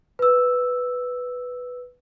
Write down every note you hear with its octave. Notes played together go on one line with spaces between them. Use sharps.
B4 E6